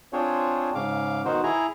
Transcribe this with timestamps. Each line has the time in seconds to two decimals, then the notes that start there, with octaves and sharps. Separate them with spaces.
0.13 C4 D4 F4 G#4 C5 C#5
0.75 G#2 C#3 F5 D6
1.25 B2 D#3 D#4 F#4 C5
1.43 E4 G#4 G#5 A#5